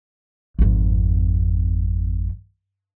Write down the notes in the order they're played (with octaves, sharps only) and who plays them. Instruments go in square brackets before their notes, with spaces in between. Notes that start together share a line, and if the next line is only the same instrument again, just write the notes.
[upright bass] G#1 F2